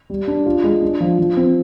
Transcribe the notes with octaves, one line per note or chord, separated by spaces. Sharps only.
G3
D4
F4
G#3
D4
F3
F3
C4